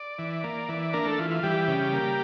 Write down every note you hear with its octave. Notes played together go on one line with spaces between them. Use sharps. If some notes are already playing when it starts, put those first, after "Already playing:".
Already playing: D5
E3
A#3
E3
A#3 D4 A#4
A3 A4
E3 F4
F4
E3 G3 G4
C#3
A#3